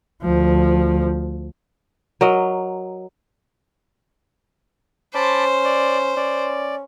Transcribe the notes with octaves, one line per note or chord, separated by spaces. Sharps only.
D2 F3
F#3 A#4 D#5
C#4 C5 A5 B5 D6
D5
C#4 D5